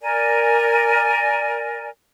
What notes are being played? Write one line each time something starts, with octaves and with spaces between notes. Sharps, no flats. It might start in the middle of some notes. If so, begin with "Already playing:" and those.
A#4 D5 G#5